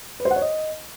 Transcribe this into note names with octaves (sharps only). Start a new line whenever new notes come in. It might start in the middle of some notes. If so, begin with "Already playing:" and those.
B4
C5
F#5
C#5
D#5